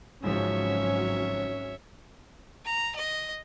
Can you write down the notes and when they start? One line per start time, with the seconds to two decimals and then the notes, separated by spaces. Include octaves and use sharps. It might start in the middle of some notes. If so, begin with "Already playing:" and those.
0.24 G#1 G#2 C#3 F3 F#3 C#4 C#5 E5
2.65 A#5
2.95 D#5